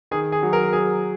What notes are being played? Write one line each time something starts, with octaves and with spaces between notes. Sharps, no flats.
D#3 G#4
G#4
F#3
A#4
F#3 G#4